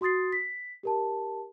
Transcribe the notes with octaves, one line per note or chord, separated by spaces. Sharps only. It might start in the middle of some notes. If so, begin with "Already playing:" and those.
F#4 C6 D#6 A6 C7
B6
G4 A#4 A5